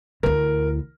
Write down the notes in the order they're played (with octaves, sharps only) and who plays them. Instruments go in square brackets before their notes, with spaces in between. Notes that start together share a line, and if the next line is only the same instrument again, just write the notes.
[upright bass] D2 E4 [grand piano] A#4